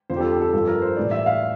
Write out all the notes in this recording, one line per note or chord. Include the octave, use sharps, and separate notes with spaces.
F2 D3 F3 C5
G4
A4
G4
A4
G2 F3 A4
A#4
C5
A2 E3 G3 D5
E5
F5